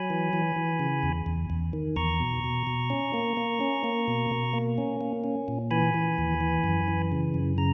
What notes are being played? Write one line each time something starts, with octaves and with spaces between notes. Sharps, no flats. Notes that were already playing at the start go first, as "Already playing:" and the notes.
Already playing: F#3 G#5 B5
E3
E3
E3
C#3
E2
E2
E2
D#3
E2 A#5 C#6
B2
B2
B2
C#4
A#3
A#3
C#4
A#3
B2
B2
A#3
C#4
A#3
C#4
A#2
E3 G#5 B5
E3
D#2
E3
F#2
E3
C#3
F#2
C#3 A#5